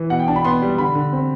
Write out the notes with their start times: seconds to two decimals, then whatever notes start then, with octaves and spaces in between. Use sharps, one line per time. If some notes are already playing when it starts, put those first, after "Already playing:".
Already playing: E3
0.10 B2 F#5
0.19 G5
0.28 D4 A5
0.36 B5
0.45 B3 C6
0.62 G3
0.78 D3 B5
0.95 D3
1.13 C4